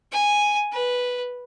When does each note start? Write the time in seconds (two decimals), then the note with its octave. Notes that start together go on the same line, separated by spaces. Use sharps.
0.12 G#5
0.72 B4